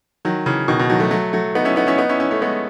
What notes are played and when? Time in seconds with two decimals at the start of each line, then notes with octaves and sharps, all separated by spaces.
0.25 D#3 F#3
0.46 C#3 E3
0.68 B2 D#3
0.79 B2 D#3
0.90 D#3 F#3
1.00 F#3 A3
1.11 F#3 A3
1.33 F#3 A3
1.55 B3 D#4
1.65 C#4 E4
1.76 B3 D#4
1.87 C#4 E4
1.98 B3 D#4
2.09 C#4 E4
2.20 C#4 E4
2.31 A3 C#4
2.41 G#3 B3